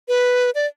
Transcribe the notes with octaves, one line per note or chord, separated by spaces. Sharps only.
B4
D5